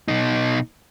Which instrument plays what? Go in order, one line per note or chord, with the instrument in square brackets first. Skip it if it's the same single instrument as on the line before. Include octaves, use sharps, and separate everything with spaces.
[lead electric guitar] B2 D#4